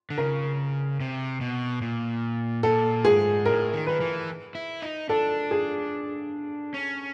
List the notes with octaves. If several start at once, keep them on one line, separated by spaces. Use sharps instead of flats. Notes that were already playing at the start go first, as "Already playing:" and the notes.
D3
C#3 A#4
C3
B2
A#2
A#2 A4
G#2 G#4
A2 A#4
D#3
D#3 B4
E3
E4
D#4
D4 A4
G#4
C#4